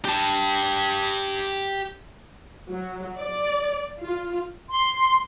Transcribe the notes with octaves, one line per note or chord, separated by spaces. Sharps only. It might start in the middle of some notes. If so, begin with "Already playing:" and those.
G4 A5
F#3
D5
F4
C6